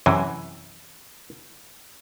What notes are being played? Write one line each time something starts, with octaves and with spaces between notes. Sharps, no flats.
F#2 C3 E3